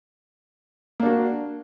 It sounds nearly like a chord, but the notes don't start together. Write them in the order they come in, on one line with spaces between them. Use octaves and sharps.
A#3 D4 F#4